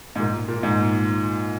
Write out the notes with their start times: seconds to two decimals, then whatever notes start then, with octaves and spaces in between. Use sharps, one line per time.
0.16 G#2
0.20 A#2
0.48 A#2
0.63 G#2